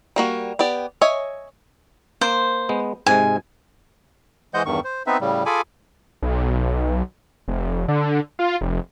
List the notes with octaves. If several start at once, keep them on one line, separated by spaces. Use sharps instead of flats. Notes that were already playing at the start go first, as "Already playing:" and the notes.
G3 A#3 F#4
B3 G4 D5
C#5 D#5 E5 G#5
A#3 C5
G#3 B3
G#2 C3 G#3 G#5
E3 G#3 C5 D#5 F#5 G6
E2 G2 D#3 C#6
C5
B3 C4 D#4 B4 E5
A2 C#3 G3
F4 G#4 A4 G#5 B5 D6
B1
F1
D3
F4
F1